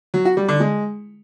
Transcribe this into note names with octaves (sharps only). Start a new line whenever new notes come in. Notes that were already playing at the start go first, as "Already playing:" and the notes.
F#3
F#4
G3
D3
G#3